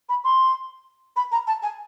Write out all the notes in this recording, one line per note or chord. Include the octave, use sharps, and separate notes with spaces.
B5
C6
B5
A#5
A5
G#5